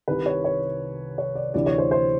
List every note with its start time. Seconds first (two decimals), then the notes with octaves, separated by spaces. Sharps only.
0.08 C2 C3 D#3 B4
0.26 C#5
0.45 C#5
1.18 C#5
1.35 D5
1.54 D2 C3 E3 D5
1.66 C#5
1.78 C5
1.91 C5